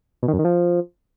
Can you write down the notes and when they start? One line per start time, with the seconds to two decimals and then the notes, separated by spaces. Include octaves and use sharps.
0.23 B2
0.28 D#3
0.34 F#2
0.39 D#3
0.45 F3